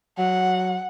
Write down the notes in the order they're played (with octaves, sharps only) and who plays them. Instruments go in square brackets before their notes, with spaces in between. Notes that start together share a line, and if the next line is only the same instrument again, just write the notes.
[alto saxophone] F#3 [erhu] F#5